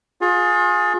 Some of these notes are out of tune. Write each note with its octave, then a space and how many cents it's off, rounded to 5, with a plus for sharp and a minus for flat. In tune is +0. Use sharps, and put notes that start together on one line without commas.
F4 +35 G#4 +10